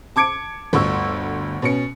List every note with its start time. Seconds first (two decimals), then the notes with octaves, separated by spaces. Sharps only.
0.16 A5 D6 G#6 C#7 D7
0.73 G1 D2 C#6 E6
1.62 B2 C#4 C#7